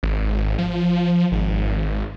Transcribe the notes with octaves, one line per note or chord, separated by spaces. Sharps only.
G#1
F3
G#1